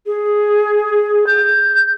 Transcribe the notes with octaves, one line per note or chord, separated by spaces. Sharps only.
G#4
G6